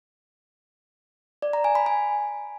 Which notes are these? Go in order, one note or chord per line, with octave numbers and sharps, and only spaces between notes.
D5
A#5
G#5
B5
G#5